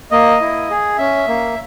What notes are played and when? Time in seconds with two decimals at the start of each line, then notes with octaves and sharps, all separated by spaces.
0.12 A#3 D#5
0.41 E4
0.70 G#4
0.98 C#4 E5
1.28 A#3